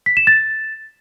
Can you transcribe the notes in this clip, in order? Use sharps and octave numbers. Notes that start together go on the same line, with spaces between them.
B6
E7
A6